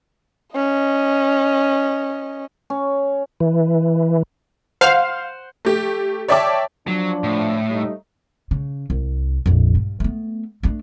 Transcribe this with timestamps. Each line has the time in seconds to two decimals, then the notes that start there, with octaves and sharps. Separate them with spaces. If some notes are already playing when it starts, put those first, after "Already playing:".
0.55 C#4 D#5
2.70 C#4
3.40 E3
4.81 C5 F5 F#5 C6
5.65 A3 G4
6.28 C#5 D5 E5 G5 A5 D6
6.87 F3 F#3 D4
7.24 A2
7.70 G3 A3 D#4
8.51 C#3
8.90 C2
9.46 A#1 F2
9.75 G2
10.00 A3 B3
10.63 A3 D4